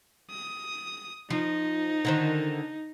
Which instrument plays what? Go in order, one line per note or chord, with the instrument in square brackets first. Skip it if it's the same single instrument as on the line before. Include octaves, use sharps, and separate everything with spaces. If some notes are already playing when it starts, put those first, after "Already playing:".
[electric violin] D#6
[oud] F3 [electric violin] D#4
[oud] D3 D#3 C5